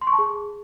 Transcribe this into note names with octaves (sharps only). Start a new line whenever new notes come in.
C6
C#6
A5
G#4